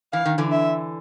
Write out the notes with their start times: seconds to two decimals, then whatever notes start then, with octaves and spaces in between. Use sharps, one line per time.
0.13 E3 F5
0.26 D#3
0.38 D3 E3
0.52 E5